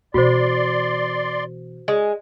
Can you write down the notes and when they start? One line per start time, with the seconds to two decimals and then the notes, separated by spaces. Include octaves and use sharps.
0.14 B2 E3 F#4 C5 D5 C6
1.88 G#3